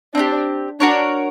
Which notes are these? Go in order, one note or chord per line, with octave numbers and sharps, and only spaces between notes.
C4 D4 D#4 G4
D4 F#4 A#4 C#5